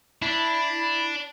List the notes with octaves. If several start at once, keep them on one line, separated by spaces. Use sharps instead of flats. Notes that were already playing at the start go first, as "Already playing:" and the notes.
D4 E4